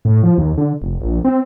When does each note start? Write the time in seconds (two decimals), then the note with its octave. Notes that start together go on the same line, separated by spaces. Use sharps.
0.05 A2
0.23 F3
0.38 D#2
0.57 D3
0.82 F1
1.01 A#1
1.24 C4